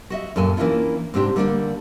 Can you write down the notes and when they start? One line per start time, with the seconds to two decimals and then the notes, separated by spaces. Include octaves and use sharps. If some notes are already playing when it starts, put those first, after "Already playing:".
0.10 F#4 D#5 E5
0.36 F#2 A#2 A4 G#5
0.57 E3 A#3 C#4 D4 E4 F4
1.14 G#2 C3 C4 D4 G4
1.36 D3 G3 A3 A#3 C#4 D4